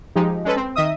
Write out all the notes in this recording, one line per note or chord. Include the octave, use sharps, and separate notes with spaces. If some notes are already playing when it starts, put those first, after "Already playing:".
F3 G#3 D#4 G4
G#3 C#4 A4 B4
C4
D#3 D#5 E5 D#6